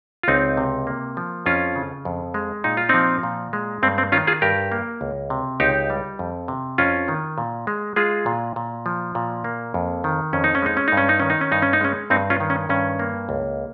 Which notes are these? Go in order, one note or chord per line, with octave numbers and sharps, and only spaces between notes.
F4
C#2 C4 D#4
C3
A#3
F3
F2 C#4 F4
C#3
F2
G#3
A#2 D#4
F4
F3 C4 D#4
A#2
G#3
G2 C4
C4
D#3 C#4 F4
F4 G#4
G2 G4 A#4
A#3
C#2
C3
C#2 D#4 G4
G3
F2
C3
F2 C#4 F4
D#3
A#2
G#3
G#3 F4 G#4
A#2
A#2
F3
A#2
A#3
F2
D#3
F2 C#4
D#4
C#4
G#3 D#4
C#4
G2 D#4
C#4
D#4
D#3 C#4
D#4
C#4
G2 D#4
C#4
D#4
G#3 C#4
G2 C4 D#4
C#4 F4
D#3
C#4
G2 C#4
A#3
C#2